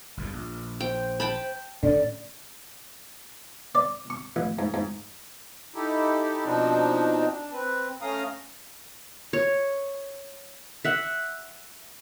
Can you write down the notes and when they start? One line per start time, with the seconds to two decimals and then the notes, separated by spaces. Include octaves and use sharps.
0.17 G1 E2 G2
0.33 A#1
0.80 C5 G5
1.20 G5 A5 B5
1.83 A2 D3 C#4 D5
3.75 D5
4.10 C#6
4.36 A1
4.59 G#2
4.74 G#2
5.75 D#4 E4 G4 A4
6.44 B2 F3 C4 D4 D#4
7.31 D4
7.52 C4 B4
8.02 A3 C#4 F5 A#5 D#6
9.33 C#5
10.85 E5 F#5